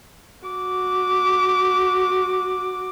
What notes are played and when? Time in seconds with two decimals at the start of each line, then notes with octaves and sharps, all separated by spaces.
0.45 F#4 D6